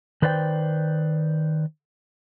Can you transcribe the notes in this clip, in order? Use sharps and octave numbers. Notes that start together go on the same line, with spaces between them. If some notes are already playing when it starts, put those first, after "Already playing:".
D#3 B4 C5 D5 E5 G5